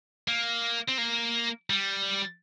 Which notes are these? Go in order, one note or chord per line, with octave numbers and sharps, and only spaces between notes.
A#3
C4
A#3
G3